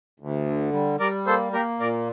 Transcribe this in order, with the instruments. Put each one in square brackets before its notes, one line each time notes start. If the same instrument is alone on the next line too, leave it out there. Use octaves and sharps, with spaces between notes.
[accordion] D2
D3
G3
[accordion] G3 [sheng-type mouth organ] A#4 D5
[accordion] A#3 [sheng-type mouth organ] A4 C5
[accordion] A#3 [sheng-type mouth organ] G4 A#4
[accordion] A#2 [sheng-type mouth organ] A#4 D5